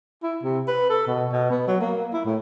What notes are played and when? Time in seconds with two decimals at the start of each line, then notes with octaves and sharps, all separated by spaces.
0.23 E4
0.43 C3
0.68 B4
0.90 A4
1.07 B2
1.32 B2
1.50 B3
1.67 F#3
1.80 A#3
2.13 E4
2.25 A2